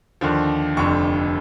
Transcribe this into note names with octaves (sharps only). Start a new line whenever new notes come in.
D#2 D3 F3
F1 F2 D3 C#6